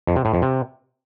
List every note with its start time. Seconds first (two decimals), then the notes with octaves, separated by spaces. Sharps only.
0.07 F2
0.16 C3
0.25 A2
0.34 F2
0.42 C3